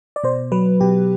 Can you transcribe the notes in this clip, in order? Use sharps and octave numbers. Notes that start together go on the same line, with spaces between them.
D5
B2 C5
F#3 B4
B2 G4